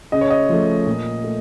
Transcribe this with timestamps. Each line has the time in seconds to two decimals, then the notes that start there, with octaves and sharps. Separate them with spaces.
0.12 C#3 D#5
0.21 C#5
0.30 D#5
0.49 F3 A3
0.87 A#2
1.24 A3